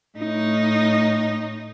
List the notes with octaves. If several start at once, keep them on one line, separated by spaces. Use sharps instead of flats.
A2 D#4